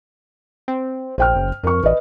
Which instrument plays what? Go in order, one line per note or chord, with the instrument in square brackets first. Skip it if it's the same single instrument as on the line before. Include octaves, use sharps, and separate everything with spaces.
[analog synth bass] C4
[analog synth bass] A#1 [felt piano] C5 G5 F6
[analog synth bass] F#1
[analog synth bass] F2 [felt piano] A#4 C#6
[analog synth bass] A1 [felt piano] B4 D#5